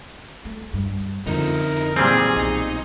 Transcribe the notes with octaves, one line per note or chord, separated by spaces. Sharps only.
A3
G2
F2 D3 D#4 E4 A#4
A#2 E3 F#3 G3 C4 G#4
B1 D#4